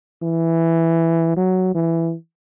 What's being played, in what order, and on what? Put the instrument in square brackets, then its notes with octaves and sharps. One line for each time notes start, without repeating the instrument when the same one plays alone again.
[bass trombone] E3
F#3
E3